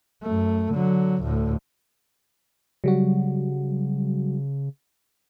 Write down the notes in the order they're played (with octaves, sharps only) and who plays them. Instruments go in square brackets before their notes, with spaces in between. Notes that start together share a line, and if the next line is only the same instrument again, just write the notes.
[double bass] F#2 A3
D3 F#3
D2 A2
[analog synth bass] C#3 [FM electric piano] F#3 G3 F#4